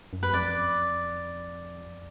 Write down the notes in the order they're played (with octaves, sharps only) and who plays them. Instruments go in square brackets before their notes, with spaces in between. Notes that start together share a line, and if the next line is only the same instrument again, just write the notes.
[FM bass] F#2
[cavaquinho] B4
[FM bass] F2 [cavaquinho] D5